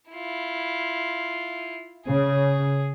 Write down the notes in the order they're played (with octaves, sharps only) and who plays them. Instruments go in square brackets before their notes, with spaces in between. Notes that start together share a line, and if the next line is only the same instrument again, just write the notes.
[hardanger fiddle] E4 F4
[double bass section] C#3 [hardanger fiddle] G#4